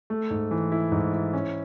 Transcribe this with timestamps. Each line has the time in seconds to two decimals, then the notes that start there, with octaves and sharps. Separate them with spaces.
0.10 A3
0.30 G#2
0.51 E3
0.72 E4
0.92 G#2
1.13 E4
1.33 C#4